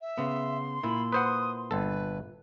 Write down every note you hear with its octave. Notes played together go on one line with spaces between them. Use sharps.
E5
C#3 B3 C6
A#2 E4 B5
B4 C5 F#5 D#6
G1 A4 B4